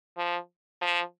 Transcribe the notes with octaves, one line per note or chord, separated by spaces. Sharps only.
F3
F3